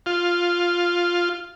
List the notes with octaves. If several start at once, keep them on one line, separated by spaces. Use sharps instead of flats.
F4